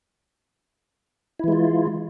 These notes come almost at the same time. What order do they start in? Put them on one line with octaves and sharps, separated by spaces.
E4 E3 G#3 F4